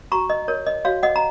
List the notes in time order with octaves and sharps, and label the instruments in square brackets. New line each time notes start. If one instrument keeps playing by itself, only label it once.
[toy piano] F#4 A#5 C#6
D#5
A#4 C#5
D#5
F#4 C#5 F5
D#5 F#5
A#5